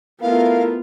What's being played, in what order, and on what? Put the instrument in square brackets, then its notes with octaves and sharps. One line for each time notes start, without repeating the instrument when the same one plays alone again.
[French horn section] A3 E4 A#4 [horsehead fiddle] B3 F4 [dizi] F5